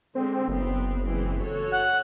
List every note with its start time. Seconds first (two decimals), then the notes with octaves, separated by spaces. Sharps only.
0.15 D3 G#3 C4
0.48 F#1 B3 C4
1.05 E3 G#3 C4
1.40 F#4 A4 C#5
1.72 F#5